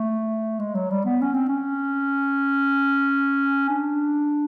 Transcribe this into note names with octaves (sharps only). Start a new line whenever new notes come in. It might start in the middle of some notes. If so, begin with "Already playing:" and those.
Already playing: A3
G#3
F#3
G3
B3
C#4
C4
C#4
D4